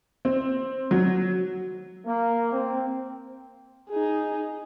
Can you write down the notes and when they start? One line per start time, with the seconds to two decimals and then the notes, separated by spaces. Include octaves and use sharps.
0.25 C4
0.91 F#3
2.06 A#3
2.53 C4
3.90 D#4 G#4